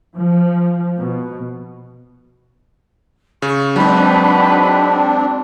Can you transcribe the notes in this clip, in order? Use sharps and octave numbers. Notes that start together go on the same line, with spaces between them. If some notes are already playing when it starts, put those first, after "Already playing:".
F3
B2
C#3 C#6
F#3 G#3 C4 D4 D#4 F#4 B4 B5